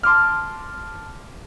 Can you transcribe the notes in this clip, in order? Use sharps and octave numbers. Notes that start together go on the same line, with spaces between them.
A5 C6 D6 F6